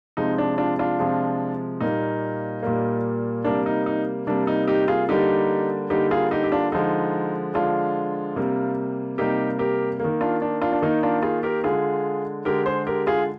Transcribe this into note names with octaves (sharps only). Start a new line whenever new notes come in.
C3 F3 G#3 D#4
D4
D4 F4
D4 F4
C3 F3 G#3
A#2 G3 A#3 D#4
A#2 G3 A#3
C3 G3 A#3 D4
D#4
D#4
C3 G3 A#3 D4
D#4
D#4 G4
F4 G#4
D3 G3 A#3 D#4 G4
D3 G3 A#3 D#4 G4
F4 G#4
D#4 G4
G4
D4 F4
D3 F3 G#3 D#4
D3 F3 G#3 D4 F4
C3 G3 A#3
C3 G3 A#3 D#4 G4
G4 A#4
D#3 A#3
D4 F4
D4
D4 F4
D4
D#3 A#3 D#4
D4 F4
F4 G#4
G4 A#4
D3 G#3 F4 G#4
D3 G#3 G4 A#4
G#4 C5
G4 A#4
F4 G#4